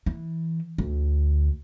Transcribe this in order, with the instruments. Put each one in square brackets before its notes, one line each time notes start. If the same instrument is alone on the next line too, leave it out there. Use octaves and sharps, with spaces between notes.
[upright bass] E3
D2